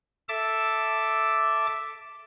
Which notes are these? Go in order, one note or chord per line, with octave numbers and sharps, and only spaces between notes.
A4 E5 A5 D6